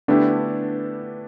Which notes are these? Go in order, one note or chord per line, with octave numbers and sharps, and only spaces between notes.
D3 A3 B3 D4 E4 G4